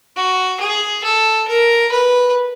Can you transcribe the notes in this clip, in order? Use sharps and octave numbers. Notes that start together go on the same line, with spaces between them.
F#4
G#4
A4
A#4
B4